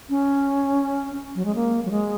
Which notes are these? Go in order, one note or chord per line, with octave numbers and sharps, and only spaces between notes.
C#4
F#3
G#3
A#3
F#3
G#3